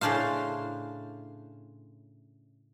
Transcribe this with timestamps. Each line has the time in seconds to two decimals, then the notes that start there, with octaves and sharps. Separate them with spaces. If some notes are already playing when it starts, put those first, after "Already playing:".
0.01 A2 C#3 C#4 D4 C5 F5